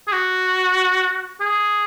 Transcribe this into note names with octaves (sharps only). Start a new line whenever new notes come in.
G#4
F#4
G#4